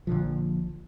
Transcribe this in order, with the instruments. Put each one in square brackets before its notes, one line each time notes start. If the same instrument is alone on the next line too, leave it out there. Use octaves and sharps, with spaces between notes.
[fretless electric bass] A#1 A#2 D3 F3